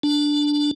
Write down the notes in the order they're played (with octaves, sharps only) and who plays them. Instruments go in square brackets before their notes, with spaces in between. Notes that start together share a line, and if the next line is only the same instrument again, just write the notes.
[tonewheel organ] D4